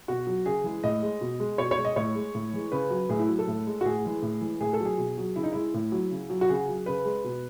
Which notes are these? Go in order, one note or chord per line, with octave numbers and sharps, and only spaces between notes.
B2 F#4
F#3
C#3 G#4
E3 G#3
A2 D#5
G#3
B2
G#3
B2 C#5
C#5
G#3
D#5
A2 C#5
G#3
A2
E3 G#3
C#3 B4
F#3
A2 G#4
E4
F#3
A4
A2
G#3
F#4
A2 G#4
E3 G#3
A2
E3 G#3
A2 G#4
A4
F#3
G#4
B2
F#3
C#3 E4
D#4
G#3 E4
A2
F#3
C#3
F#3
F#4
C#3 G#4
F#3
C#3 B4
G#3
B2